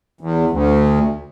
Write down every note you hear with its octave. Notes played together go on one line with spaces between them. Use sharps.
E2
D2